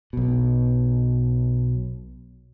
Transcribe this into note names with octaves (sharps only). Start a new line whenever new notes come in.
B1 B2